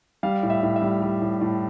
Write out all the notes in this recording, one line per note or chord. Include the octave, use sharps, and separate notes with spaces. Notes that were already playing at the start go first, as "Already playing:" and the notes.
G3 F5
A2
E5
A2
E5
G3
G3
A2
A2